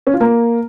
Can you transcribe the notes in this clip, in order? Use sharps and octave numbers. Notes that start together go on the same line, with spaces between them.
C#4
F4
A#3